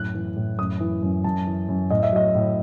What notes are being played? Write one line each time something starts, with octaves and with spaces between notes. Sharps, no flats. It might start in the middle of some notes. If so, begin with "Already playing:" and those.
Already playing: F#2 A2 F#6
E3
A2
F#2 D#6
E3
F#2
F#2 A5
E3
F#2
A2 D#5
E5
F#3 D#5
A2